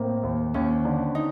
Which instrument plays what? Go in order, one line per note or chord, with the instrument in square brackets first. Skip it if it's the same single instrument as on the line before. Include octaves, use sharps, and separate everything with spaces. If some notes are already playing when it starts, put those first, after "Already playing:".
Already playing: [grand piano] A2 A#3 [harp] C4
[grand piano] D#2
[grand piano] D#2 [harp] C#4
[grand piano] D3
[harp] D#4